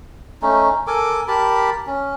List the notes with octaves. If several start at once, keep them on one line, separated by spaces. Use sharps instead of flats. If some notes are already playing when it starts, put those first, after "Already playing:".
A3 C#4 D#4
A4 A#4 G#5 D6
G4 A#4 A5 B5
C#4